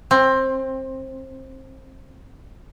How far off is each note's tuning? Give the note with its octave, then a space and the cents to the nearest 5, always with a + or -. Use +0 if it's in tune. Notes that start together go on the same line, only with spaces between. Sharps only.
C4 +20